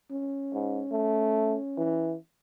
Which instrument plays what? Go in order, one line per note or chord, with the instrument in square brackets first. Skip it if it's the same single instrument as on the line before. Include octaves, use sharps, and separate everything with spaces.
[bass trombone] C#4
[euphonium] G#2
A3
E3